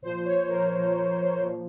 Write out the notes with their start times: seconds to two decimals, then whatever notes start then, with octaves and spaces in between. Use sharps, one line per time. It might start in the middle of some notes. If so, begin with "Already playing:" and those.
0.02 A#2 F3 C5
0.25 C#5
0.49 A#4
0.72 A#2 F3
1.42 A#2 F3